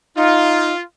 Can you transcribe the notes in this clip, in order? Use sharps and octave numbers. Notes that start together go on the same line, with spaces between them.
D#4 F4